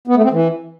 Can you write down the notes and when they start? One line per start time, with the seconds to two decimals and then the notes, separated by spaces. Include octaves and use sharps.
0.07 B3
0.16 A3
0.24 C4
0.32 E3